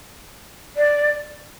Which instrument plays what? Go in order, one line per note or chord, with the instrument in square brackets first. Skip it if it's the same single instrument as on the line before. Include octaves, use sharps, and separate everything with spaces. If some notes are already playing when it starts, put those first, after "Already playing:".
[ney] D5